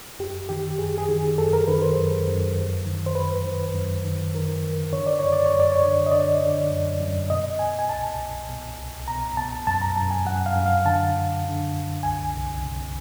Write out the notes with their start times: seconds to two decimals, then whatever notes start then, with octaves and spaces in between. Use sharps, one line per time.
0.19 F#2 G4
0.49 D#3 G4
0.79 F#2 G#4
0.98 G#4
1.08 D#3
1.18 G#4
1.38 F#2 A4
1.53 A#4
1.67 D#3 B4
1.82 C5
1.97 F#2
2.27 F#2
2.57 F#2
2.86 D#3
3.06 C5
3.15 F#2 B4
3.46 D#3
3.74 F#2
4.05 D#3
4.34 D#3 A#4
4.63 D#3
4.93 D3 C#5
5.07 D5
5.19 F#2 C#5
5.33 D5
5.46 C#5
5.53 F#2
5.60 D5
5.72 C#5
5.81 D3
6.06 D#5
6.11 D3 D5
6.41 D3
6.71 F#2
7.01 F#2
7.30 B2 D#5
7.59 B2 G#5
7.79 G#5
7.89 C2 A5
8.19 C2
8.49 B2
8.78 C2
9.08 B2 A#5
9.37 B2 A5
9.67 F#2 A5
9.82 A#5
9.96 F#2 A5
10.11 G#5
10.26 F#2 F#5
10.46 F5
10.56 F#2
10.66 F5
10.85 D3 A5
11.15 D3
11.45 D3
11.74 F#2
12.03 C2 G#5
12.34 C2
12.64 C3